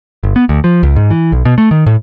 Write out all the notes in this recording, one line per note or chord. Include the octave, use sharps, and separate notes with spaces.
G1
B3
D2
F3
C#2
G#2
E3
B1
B2
A3
D#3
A2